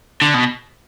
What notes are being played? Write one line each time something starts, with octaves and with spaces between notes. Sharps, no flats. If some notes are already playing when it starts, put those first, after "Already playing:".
D3
B2